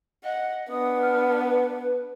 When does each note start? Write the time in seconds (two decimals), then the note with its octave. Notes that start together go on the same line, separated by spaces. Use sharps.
0.24 D#5 F#5
0.70 B3 D4 D#6
1.01 F6
1.38 B4